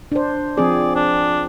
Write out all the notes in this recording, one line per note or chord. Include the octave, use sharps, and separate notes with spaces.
D4 C5
F3 C4 G#4 D5
D4